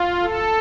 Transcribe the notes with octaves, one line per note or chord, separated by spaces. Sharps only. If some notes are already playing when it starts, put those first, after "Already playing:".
Already playing: F4
A4